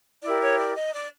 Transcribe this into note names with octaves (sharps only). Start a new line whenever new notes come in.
E4 G4 A#4 D5
C#5
D5
D#5
D5